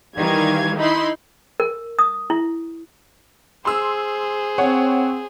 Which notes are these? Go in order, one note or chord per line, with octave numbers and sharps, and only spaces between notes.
D#3 E3 G3 F5 G#6
D#4 E4 B5 C6
A#4
D#6
E4
G#4 C5 C6 E6
C4 C#5 F#5